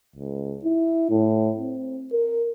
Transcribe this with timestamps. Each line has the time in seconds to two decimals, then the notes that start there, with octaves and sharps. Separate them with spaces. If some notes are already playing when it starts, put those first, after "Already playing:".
0.16 C#2
0.64 E4
1.11 A2
1.58 C4
2.12 A#4